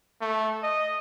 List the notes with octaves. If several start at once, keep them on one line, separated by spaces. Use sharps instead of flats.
A3
D#5